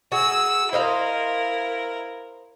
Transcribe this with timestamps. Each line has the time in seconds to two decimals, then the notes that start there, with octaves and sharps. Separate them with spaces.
0.12 F#4 G#4 E6
0.73 E4 A#4 C5 D#5 F5